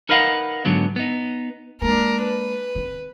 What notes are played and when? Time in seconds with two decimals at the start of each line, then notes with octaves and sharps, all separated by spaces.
0.09 D#4 A#4 B4 D#5 F5 F#5
0.65 G#2 D3 F#3 B3
0.96 B3 D#4
1.82 G#3 A#3 D4 A#4
2.22 B4
2.75 D#3 C4